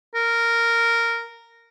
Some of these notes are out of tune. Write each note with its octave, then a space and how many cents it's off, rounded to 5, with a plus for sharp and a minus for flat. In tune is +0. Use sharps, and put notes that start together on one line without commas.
A#4 -10